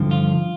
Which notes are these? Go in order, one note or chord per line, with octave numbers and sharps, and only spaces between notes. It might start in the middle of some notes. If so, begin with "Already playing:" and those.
Already playing: G2 D3 F3
F4